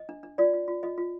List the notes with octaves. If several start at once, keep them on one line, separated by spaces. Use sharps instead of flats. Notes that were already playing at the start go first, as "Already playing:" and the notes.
Already playing: D#5
D4
D4
F4 D5
F4
F4
F4 D#5
F4